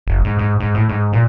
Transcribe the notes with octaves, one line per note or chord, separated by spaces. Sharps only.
F#1
G#2
G#2
G#2
A2
G#2
A#2